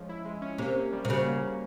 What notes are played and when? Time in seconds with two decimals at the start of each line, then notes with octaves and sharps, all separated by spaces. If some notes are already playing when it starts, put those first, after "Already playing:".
Already playing: F3 G#3 C#4
0.09 E4
0.25 G#3
0.42 C#4
0.58 C3 A#3
0.76 C#4
0.93 G3
1.05 C3
1.09 C#3 F#4
1.26 A#3
1.43 C#4